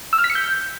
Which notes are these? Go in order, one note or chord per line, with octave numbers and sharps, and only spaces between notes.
E6
F6
B6
C#7
G6